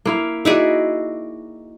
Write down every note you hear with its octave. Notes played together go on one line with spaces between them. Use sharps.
A#3 E4 F5
D#4 E4 F#4 G#4 D5 E5